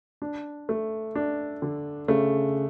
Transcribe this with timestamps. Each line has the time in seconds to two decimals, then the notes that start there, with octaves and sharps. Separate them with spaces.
0.22 D4
0.69 A3
1.15 D4
1.62 D3
2.08 C#3 A3